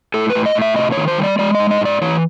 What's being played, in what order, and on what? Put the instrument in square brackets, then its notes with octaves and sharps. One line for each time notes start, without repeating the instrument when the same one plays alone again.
[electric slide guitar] A2 A4
B4
A2
D#5
A2
E5
C3 D#5
C#5
D#3
C5
G3
D5
G#3 D5
D#5
G#2
D#5
G#2 D5
E3 C#5